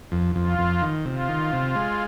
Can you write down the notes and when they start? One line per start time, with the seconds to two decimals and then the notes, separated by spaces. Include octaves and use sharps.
0.12 F2
0.35 F2 F4
0.59 F2
0.82 D#3
1.05 C3 F4
1.29 D#3
1.52 C3
1.76 G#3